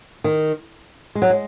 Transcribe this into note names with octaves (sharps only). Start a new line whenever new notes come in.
D#3
G#3
F#3
G#3